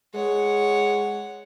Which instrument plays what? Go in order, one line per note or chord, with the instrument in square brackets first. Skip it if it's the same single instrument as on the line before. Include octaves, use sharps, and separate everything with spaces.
[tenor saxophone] G#3 [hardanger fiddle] C#5 F#5